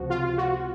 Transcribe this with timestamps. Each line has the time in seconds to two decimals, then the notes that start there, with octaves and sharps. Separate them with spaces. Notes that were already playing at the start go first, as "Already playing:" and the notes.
Already playing: C#2 C3 F3 F#4
0.10 F4
0.38 F#4